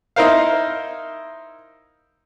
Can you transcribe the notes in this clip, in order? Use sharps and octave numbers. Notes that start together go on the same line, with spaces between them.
D#4 E4 A#4 C5 F5